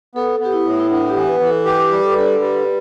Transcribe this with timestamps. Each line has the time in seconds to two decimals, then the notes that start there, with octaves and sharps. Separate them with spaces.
0.15 B3 A4
0.40 B3
0.45 G4
0.53 E4
0.65 A2
0.80 E4
0.90 B3 D4
1.10 G4
1.16 E3
1.27 B4
1.40 E3
1.47 A4
1.65 G4 B4
1.91 G3
2.03 A4
2.11 B4
2.16 D3 A4
2.40 G3 B4